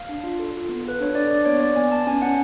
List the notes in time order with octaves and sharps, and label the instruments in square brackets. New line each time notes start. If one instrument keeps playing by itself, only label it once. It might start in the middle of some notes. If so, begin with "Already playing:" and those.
Already playing: [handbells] F5
D4
F4
A4
F4
B3
A4 B4
D4 C#5
D4 D5
D4 D5
B3 C#5
B3 D5
B3 G#5
B3 A5
C#4 G#5
C#4 F#5